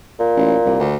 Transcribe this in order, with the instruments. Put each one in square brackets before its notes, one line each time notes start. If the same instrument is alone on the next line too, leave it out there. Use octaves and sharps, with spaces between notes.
[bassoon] A#2
[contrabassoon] A1
C2
D2